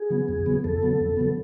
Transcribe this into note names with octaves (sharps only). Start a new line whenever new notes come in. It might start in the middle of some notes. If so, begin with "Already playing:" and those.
Already playing: G#4
C#3 F#3 B3
F2
C#3 F#3 B3
F2 A4
C#3 F#3 B3
F2
C#3 F#3 B3